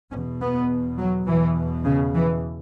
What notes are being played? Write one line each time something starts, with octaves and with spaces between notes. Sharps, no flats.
E2 B2 C#4
B3
F#3
E2 B2 E3
C#3
E3